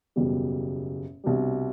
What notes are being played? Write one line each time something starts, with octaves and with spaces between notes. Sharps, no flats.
F#1 E2 B2 G3
C2 B2 G3 D4